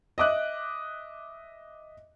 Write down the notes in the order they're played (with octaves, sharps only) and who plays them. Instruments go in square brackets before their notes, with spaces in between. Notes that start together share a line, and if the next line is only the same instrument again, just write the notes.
[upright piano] D#5 E5 D6 D#6 F#6